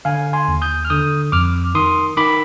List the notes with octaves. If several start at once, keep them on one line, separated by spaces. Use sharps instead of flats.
D3 F5 G#5
G#5 C6
D#2
D#6 G6
F6
D3 D#6 G6
F2 D6 F6
D#3 C6 D#6
D#3 B5 D6